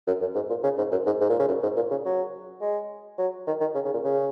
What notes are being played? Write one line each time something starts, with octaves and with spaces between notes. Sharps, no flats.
F#2
F#2
G#2
A#2
C#3
G#2
F#2
G#2
G#2
A#2
C#3
F#2
G#2
A#2
C#3
F#3
G#3
F#3
D#3
D#3
C#3
C#3
A#2
C#3